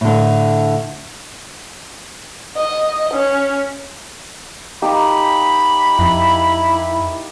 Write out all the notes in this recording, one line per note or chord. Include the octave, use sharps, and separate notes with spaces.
A2 D3
D#5
C#4
A#3 D#4 G4 B5
F2 E4